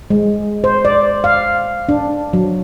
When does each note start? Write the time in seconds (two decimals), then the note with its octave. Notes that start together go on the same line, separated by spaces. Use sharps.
0.10 G#3
0.64 C5
0.85 D5
1.24 F5
1.89 D4
2.33 F#3